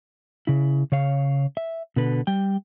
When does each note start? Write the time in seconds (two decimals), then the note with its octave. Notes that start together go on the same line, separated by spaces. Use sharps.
0.47 C#3 E4
0.92 C#3 C#5 F5
1.57 E5
1.96 B2 D3 B4
2.27 G3 G5